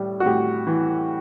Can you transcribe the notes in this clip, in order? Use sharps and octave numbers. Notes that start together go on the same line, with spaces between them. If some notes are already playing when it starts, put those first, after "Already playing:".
Already playing: A2 G3
F#4
A2 G4
E3